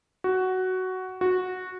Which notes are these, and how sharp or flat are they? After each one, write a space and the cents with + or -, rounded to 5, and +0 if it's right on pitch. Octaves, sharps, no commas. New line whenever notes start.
F#4 +10
F#4 -10